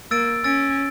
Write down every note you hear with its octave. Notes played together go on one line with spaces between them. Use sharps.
A#3 E6 A6 D7
C#4 E6 A6 D7